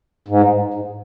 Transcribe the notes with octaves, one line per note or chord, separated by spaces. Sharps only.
G#2
G#2